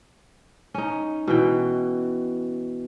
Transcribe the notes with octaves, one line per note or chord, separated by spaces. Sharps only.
C#4 D#4
B2 E3 G5